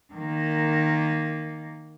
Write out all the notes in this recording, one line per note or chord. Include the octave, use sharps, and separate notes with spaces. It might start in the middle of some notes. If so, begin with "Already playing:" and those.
D#3 A#3